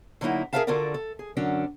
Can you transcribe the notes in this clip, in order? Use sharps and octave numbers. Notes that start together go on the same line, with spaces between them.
D3 F#3 A#3 D#4 E4
G#4 A#4 B4 E5 F5 A5
D3 F4 F#4 A4 A#4 D5
A4
G#4
F#2 D3 F#3 C#4 D4